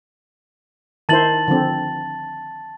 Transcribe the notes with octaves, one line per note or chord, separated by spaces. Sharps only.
D#3 E4 C5 A5 A6 F#7
D3 F3 C4